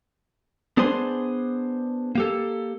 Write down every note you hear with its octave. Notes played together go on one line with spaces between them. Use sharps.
B3 D4 G#4 C5 G#5 C6
A#3 G4 A4